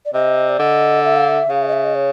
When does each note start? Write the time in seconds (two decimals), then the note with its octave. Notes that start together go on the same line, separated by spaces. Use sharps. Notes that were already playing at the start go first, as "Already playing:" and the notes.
0.06 D5
0.14 C3 D#5
0.49 D5
0.59 D3 D#5
1.05 E5
1.16 F5
1.29 E5
1.49 C#3 F5
1.62 E5
1.68 D#5
1.73 E5
1.84 D#5
1.95 C#5